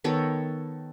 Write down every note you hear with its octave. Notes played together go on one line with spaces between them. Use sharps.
D#3 B3 A4 C#5